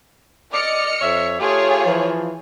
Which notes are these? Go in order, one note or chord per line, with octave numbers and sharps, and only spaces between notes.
D5 D#5 F6 C#7
F2 C#5 E5
A3 F4 G4 G#4 C#5
E3 F3